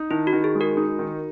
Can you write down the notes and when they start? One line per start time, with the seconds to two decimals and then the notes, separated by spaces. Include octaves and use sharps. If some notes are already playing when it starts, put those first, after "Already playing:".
Already playing: D#4
0.11 D#3 E4
0.27 F#4
0.33 D#3
0.44 G#4
0.55 G#3
0.61 F#4 A#4
0.77 D#4
0.99 D#3